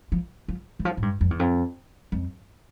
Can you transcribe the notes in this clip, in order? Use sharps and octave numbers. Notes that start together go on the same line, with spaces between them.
F3
F3
E3
F3
A2
G2
F2
E2
F2
F2